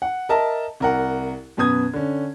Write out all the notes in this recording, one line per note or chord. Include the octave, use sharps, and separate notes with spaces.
F#5
A#4 D#5 E5 A5
C2 A#4 F#5
F#2 B2 B3 D#6 G#6
D3 C#4